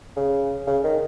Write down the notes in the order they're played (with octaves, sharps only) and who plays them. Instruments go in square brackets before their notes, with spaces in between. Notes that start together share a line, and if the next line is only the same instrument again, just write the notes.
[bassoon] C#3
C#3
D#3